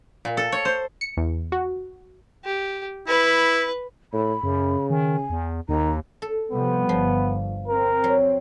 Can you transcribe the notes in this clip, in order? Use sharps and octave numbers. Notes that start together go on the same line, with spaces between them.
A#2
A4
C#5
C5
C#7
E2
F#4
G4
E4 B4
A2 B5
F#2 C#3
D#3 G#5
E2
D#2 D#3 A#5
A4
C3 F3 G3 B3
G1 F3
C4 A#4
F#3